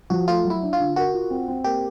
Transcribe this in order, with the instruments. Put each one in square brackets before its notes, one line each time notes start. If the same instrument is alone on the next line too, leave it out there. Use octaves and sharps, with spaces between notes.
[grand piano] F3 [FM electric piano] F#4
[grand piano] A3 [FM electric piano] F4
[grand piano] F#3
[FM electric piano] E4
[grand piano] D4
[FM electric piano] F4
[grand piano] D3
[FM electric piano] F#4 [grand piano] A#4
[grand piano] F4
C4
C4
[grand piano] A#3 [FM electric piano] G4